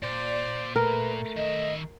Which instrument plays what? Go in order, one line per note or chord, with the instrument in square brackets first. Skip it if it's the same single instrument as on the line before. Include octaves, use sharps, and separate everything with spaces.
[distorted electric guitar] A#2 [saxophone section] C5 D5
[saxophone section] A3 [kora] A#4 [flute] B4
[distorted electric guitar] D#3 E5 [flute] D#5